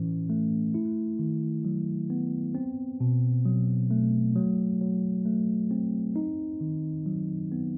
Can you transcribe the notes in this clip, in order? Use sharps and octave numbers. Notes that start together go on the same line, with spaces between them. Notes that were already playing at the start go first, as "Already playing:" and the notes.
Already playing: A2 E3 C#4
A3
E4
D#3
F#3
B3
C4
B2
F#3
A3
F#3
F#3
A3
C4
D#4
D#3
F#3
B3